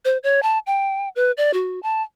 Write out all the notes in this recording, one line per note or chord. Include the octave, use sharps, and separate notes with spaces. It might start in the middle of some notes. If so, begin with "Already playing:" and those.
C5
C#5
A5
G5
B4
D5
F#4
A5